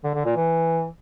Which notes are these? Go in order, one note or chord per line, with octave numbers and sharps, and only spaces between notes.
D3
D3
A#2
E3